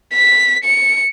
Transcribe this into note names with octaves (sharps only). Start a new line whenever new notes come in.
B6
C#7